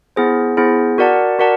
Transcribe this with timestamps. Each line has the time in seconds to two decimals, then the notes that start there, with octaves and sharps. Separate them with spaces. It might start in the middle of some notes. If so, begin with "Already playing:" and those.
0.16 B3 E4 G#4 C5
0.57 B3 E4 G#4 C5
0.98 F#4 A#4 D5 F#5 A5
1.39 F#4 A#4 D5 F#5 A5